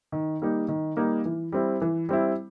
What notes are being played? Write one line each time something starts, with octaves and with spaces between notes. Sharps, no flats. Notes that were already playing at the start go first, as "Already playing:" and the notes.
D#3
G3 A#3 D#4
D#3
G3 A#3 D#4
E3
G3 C4 E4
E3
G3 C4 E4